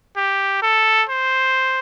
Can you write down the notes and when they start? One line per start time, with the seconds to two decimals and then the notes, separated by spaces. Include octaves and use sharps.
0.17 G4
0.62 A4
1.09 C5